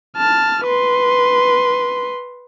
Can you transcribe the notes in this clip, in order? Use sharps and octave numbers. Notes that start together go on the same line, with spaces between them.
A5 F6
B4 C6